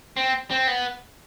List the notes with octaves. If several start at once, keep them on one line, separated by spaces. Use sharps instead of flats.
C4
C4
B3